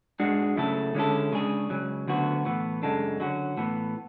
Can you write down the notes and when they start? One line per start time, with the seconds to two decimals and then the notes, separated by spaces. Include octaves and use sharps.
0.20 G#2 G#3 D4 F#4
0.57 C#3 F#3 A3 E4 A4
0.95 D3 G#3 C#4 E4 A4
1.32 C#3 G#3 D4 G#4
1.70 C#2 C#3 F#3
2.08 D2 D3 F#3 B3 F#4
2.45 A2 E3 B3
2.83 F#2 C#3 G#3 D4 A4
3.20 D3 F#3 C#4 F#4
3.57 A2 E3 B3